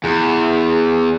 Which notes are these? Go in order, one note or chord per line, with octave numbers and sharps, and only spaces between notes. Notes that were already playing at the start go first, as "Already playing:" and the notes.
E2